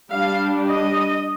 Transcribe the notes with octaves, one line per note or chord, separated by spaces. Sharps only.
G3 D4 F5
D#5